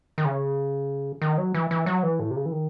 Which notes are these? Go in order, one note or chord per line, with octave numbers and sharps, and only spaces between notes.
D#3
C#3
D#3
F#3
E3
E3
F#3
E3
A2
C3
C#3
E3
D#3